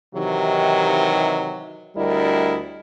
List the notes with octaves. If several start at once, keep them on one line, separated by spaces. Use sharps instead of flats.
C3 D#3 E3 F#3 D#4 G4
D2 G3 D4 E4 A#4 D#5